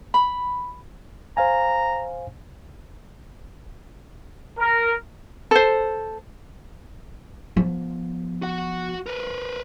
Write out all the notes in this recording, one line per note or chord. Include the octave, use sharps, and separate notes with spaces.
B5
C5 F5 G#5 A#5
A#4
A4 C5
F3 B3
F#4 F#5
A#4 B4